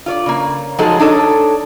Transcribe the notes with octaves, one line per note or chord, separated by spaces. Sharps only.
F4 C#5 D5
C#3 A#3
F3 F#3 G#3 D#4 G#4 A4
D4 D#4 A4 C#5